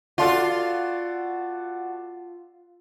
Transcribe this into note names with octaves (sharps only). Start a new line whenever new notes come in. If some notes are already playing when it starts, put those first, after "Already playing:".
F4 F#4 A4 D5